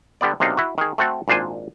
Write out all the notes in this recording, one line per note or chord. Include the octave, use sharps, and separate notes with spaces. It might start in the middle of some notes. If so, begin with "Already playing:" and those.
D3 G3 B3 D5
B1 C3 A#3 D4 D#4 F5
E4 F#4
D#3 G#4
A3 C4 F#4 A4
G#1 A#2 D4 C5 G#5